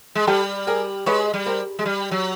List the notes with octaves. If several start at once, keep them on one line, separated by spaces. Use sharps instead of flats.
G#3
G3 G4 A4
G#4 A#4
G#3 B4 C#5
G3
A#4 C5
G#3
G3
F#3